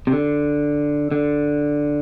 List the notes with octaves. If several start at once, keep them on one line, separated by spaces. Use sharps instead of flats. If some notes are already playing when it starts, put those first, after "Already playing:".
C3
D3
D3